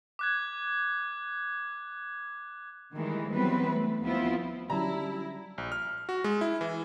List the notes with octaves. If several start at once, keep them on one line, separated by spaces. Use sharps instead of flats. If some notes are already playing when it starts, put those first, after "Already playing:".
D6 F#6 G#6
D#3 E3 G3 G#3
E3 F#3 G3 B3 C4 B4
A3
D#2 F3 B3 C4 E4 F4
D3 F#3 G3 C#4 E4 A5 A#5
A#1
F6
F#4
G#3
E4
E3